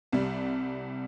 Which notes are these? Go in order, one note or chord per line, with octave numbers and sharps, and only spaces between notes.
C2 C3 G3